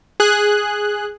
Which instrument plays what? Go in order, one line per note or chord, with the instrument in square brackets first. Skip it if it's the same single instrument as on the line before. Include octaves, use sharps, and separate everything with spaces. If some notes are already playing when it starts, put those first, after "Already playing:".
[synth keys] G#4 F#6